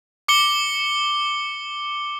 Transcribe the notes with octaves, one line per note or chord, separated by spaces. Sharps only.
D6 C#7 G7